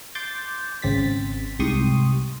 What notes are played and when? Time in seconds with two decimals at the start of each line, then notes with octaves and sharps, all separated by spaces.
0.15 C6 D6 G6 A6
0.82 G#1 C#3 C4 C5 A6 B6
1.59 C2 G#2 G4 C6 C#6 D#6